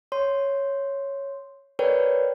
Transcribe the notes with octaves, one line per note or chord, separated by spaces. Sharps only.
C#5 C6
A#4 B4 C#5 D5 G5